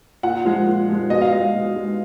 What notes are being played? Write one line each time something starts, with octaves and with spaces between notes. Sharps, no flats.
A#2 F#5
F3 G#3
A#2
F3 G#3
B2 D#5
F5
G#3 D#5
B2
G#3